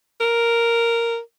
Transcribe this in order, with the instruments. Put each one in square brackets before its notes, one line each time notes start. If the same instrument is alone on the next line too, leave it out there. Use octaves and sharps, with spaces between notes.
[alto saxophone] A#4